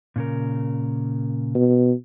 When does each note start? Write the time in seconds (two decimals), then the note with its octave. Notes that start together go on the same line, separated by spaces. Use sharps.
0.16 A#2 C#3 A#4
1.55 B2